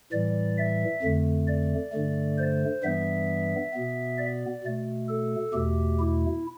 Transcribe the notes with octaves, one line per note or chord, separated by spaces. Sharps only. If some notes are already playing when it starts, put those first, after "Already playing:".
A2 E3 G3 D5
E5
F2 D3 A3
D5
G2 D3 A3
C5
G2 E3 G3 B3 E5
B2 B3
D5
B2 A3
A4
E2 B2 A3 G4
E4